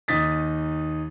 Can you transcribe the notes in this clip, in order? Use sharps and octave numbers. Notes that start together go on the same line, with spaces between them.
D#2 D#4 D#6 A6 B6